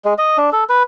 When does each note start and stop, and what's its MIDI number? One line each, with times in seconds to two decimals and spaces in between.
0.05 0.14 56
0.18 0.37 75
0.38 0.50 62
0.53 0.64 69
0.69 0.83 71